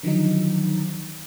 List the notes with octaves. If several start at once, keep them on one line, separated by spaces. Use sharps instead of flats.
D3 D#3 F3 F#3 D#4